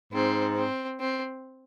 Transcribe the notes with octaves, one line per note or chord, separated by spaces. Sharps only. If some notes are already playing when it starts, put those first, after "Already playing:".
G#2 C4
C4
C4